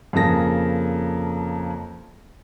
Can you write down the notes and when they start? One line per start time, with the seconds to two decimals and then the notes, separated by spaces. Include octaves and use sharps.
0.13 F2 C#3 A#3 G#4 A5 A#6